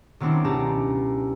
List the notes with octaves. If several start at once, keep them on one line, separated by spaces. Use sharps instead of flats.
D#3 F#3 B3 C4 D4 E4
C#2 B2 G4 A5 A#5